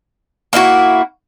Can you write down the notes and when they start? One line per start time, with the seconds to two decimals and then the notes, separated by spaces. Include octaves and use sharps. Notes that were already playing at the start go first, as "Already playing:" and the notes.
0.53 A#3 D4 E4 F#4